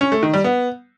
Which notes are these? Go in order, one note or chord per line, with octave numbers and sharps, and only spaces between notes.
C#4
A3
D#3
G3
B3